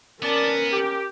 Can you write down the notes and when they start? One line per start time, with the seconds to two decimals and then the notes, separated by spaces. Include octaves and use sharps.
0.22 B3 C#4 A#4 D5 A5
0.72 G4